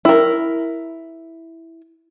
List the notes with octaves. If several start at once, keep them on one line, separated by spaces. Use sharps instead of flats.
E4 A#4